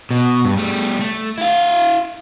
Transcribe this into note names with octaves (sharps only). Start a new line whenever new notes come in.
B2
G2
G3 A3
A3
E4 F5